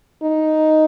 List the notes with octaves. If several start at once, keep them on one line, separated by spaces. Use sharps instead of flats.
D#4